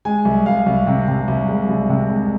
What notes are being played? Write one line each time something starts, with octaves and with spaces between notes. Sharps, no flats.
G#3 G#5
C2
C2 F5
C2
C3
C3
C2
G#3
C2
C3
G#3